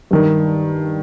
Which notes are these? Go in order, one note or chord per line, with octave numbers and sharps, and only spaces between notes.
G2 D#3